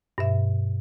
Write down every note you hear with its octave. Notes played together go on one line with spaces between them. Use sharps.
G2 B2 E5